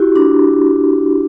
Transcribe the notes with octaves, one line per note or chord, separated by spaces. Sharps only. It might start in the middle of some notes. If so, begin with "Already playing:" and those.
Already playing: E4 F#4 G4
D4